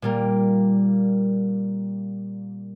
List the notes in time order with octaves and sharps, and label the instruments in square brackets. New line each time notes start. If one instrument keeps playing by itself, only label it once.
[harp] A#2 G3 A#3